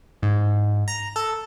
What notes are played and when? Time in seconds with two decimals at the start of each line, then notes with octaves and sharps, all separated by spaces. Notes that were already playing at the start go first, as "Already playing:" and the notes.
0.23 G#2
0.88 A#5
1.16 A4